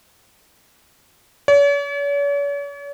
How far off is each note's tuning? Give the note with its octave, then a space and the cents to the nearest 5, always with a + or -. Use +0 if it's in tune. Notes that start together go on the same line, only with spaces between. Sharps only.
C#5 +45